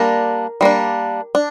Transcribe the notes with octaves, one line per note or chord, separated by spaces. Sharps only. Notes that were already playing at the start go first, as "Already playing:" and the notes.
Already playing: G3 A#3 D4 A#4
G3 A#3 D4
D4